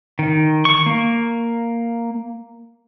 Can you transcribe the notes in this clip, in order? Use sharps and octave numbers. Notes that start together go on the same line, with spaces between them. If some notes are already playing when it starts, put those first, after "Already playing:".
D#3
C#6
A#3